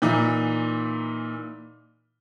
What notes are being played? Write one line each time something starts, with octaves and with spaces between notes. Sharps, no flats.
A#2 E3 D#4